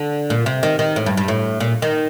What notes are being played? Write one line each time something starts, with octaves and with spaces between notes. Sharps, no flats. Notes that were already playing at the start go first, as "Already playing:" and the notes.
Already playing: D3
A#2
C3
D#3
D#3
A2
G2
G2
A2
A#2
D#3